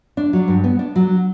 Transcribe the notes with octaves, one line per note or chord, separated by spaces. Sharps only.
D4
F#3
G2
B3
D4
F#3